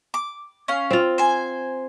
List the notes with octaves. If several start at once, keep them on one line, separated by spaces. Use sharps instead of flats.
D6
C#4 F5
C4 F4
C5 G#5